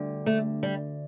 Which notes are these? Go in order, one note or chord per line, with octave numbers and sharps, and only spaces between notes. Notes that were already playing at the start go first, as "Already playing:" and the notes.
Already playing: D2 D3 G3
A3
G3